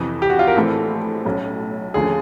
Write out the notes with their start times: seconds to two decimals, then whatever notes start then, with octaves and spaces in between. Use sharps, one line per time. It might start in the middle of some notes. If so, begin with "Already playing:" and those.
Already playing: F2 C3 E3
0.22 G4
0.30 F#4
0.39 F4
0.47 A#4
0.56 A#1 A2 E3 A3 C4 A4
1.25 B1 A2 F#3 A3 C#4
1.94 D#2 D3 F3 A3 C#4 G#4